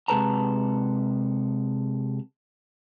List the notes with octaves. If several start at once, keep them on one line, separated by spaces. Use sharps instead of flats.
C3 G#3 A4 B4 A5 A#5